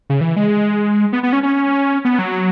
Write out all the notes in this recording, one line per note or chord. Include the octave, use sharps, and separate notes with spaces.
C#3
E3
G#3
B3
B3
C#4
C#4
B3
F#3